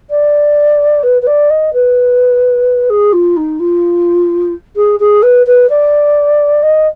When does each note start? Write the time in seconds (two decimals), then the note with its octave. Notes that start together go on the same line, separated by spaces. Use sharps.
0.10 D5
1.03 B4
1.22 B4
1.27 D5
1.50 D#5
1.73 B4
2.90 G#4
3.13 F4
3.37 D#4
3.60 F4
4.76 G#4
5.00 G#4
5.23 B4
5.47 B4
5.69 D5
6.63 D#5